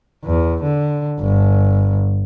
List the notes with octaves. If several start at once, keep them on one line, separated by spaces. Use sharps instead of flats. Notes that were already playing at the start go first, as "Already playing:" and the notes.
E2
D3
G1